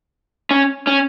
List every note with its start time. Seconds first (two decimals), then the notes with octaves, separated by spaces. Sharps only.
0.51 C#4
0.87 C#4